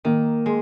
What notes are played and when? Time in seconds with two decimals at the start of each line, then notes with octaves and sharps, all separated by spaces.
0.05 D#3 A#3
0.46 G#3